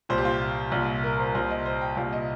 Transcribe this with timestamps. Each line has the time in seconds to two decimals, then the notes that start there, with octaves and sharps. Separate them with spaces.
0.09 C2 A#2 C5
0.18 G4
0.25 F4
0.72 C2 A#2
1.04 A#4
1.19 C5
1.35 C2 A#2 C5
1.50 D#5
1.65 C5
1.81 G5
1.97 C2 A#2 F5
2.13 D#5